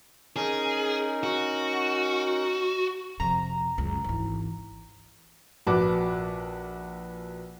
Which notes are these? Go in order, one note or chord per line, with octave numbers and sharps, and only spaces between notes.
C#4 D#4 G#4 A#4
F#4
F2 C3 A#5
C#2 F#2
G#1 E3
A#1 F#4 B4 A5 D6